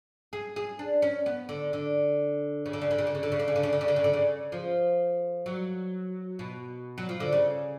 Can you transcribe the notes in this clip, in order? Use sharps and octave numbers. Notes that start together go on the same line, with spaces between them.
G#4
G#4
D4
C#4
B3
D3
D3
C#3
D3
C#3
D3
C#3
D3
C#3
D3
C#3
D3
C#3
D3
C#3
D3
C#3
D3
C#3
D3
C#3
F3
F#3
B2
F#3
F3
D3
C#3